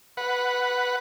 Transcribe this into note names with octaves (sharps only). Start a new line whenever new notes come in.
B4 F#5